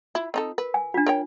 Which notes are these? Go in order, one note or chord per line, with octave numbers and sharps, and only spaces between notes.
E4 F4
C4 D#4 A4
A#4 B4
G#5
D4 F4
A#4 C#5 G5